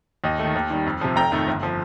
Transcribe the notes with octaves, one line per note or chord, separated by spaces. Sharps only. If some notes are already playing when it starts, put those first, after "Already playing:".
D#2 D#5
A3
D#3
D#2
D#3 G3
F2
C3 F3
F1 G5 A#5
F2 D#3 A3
G1
F3